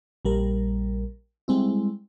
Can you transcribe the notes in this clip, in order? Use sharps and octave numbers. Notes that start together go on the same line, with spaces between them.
A#1 G3 A#4
G3 G#3 C4 E4